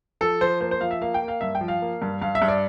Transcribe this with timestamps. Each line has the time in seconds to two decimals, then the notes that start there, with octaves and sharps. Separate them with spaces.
0.21 F3 A4
0.41 F3 C5
0.61 A#3 C5
0.71 C5
0.81 F3 F5
0.91 E5
1.01 A#3 F5
1.14 G5
1.22 A#3
1.28 F5
1.41 G2 E5
1.55 G5
1.61 F3
1.68 F5
1.82 A#3
2.02 G2
2.22 G2 F5
2.35 E5
2.42 G2
2.48 D5